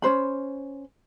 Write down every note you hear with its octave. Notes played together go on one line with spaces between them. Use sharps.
C#4 D4 C5 B5